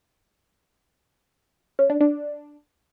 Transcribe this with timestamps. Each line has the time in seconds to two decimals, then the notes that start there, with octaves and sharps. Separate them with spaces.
1.79 C#4
1.90 D4
2.01 D4